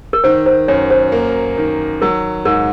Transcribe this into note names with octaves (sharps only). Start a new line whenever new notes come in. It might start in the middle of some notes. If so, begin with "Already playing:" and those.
A#4
D#3 C5
C5
F#2 C#5
C5
A#3
D#3
F#3 A#4
G#2 A#4